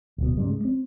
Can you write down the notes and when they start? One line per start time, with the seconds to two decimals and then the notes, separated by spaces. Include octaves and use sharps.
0.18 D1 B2
0.38 G#2 C#3 G3
0.50 G#3
0.65 C4